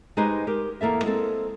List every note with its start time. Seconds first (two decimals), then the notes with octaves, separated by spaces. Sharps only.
0.17 G#3 D#4 G4 B4 C5 G#5
0.47 G4 A#4
0.81 E2 A#3 A4 E5
1.03 G#3 A#3 C4 A4